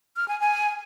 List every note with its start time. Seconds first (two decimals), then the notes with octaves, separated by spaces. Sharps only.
0.16 F6
0.28 G#5
0.40 G#5